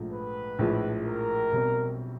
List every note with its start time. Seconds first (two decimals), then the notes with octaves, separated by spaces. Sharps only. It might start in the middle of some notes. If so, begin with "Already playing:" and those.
Already playing: A#1 G#2 F3 A3
0.13 B4
0.59 A#1 A2 F3 G#3
1.06 A#4
1.53 B1 B2 G3 C4